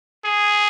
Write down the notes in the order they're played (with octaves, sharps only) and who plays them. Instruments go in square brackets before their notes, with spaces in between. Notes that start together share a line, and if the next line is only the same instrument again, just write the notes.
[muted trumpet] G#4